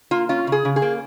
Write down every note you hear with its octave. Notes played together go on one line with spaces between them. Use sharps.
A#3 F4
C#4 F4
C#3 G#4
C#3
G#4
A#3